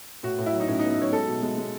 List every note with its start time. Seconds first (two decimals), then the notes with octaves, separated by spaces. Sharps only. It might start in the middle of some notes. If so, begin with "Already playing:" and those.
0.23 A2 F#4
0.39 A2
0.46 E4
0.53 F#3
0.60 D#4
0.68 A2 C#4
0.79 D#4
0.83 B3
0.91 D#4
0.98 F#3 C#5
1.12 G#3 A4
1.27 B2
1.43 G#3
1.58 G#3